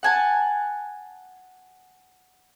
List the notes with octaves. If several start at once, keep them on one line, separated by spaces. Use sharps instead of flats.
F#5 G#5 A5